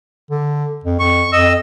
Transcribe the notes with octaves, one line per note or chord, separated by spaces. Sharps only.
D3
F2
F2 C#6
F2 D#5 E6